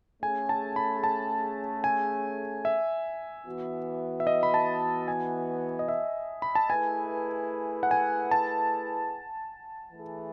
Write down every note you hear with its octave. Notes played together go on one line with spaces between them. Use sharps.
A3 C#4 G#4 G#5
A5
B5
A5
G#5
E5
E3 B3 F#4
E5
D#5
B5
A5
G#5
D#5
E5
B5
A5
A3 E4 G#4 B4 G#5
F#5
G#5
A5
E3 A3 E4 G#4